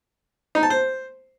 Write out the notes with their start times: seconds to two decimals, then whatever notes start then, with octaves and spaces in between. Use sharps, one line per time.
0.55 D#4
0.63 A5
0.70 C5